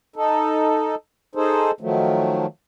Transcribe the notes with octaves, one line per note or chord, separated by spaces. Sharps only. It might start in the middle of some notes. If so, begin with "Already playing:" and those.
D#4 A4
D#4 G#4 A4 C5
D#3 F3 F#3 A3